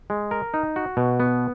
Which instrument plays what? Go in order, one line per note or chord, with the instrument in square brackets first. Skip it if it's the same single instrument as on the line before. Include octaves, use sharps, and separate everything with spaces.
[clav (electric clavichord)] G#3
A#4
D#4
F#4
B2
B3